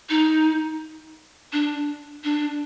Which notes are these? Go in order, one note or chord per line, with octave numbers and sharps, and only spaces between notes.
D#4
D4
D4